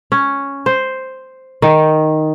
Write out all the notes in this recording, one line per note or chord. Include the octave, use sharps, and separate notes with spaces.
C#4
C5
D#3